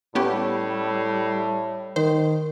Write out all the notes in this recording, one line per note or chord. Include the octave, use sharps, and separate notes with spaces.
A2 G3 B3 C#4 G4
D#3 C5